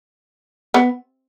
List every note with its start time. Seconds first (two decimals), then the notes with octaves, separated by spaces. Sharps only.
0.74 B3